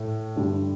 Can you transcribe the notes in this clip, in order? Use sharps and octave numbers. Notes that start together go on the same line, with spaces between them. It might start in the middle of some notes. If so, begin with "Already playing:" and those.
Already playing: A2 A3
G2 D3 G3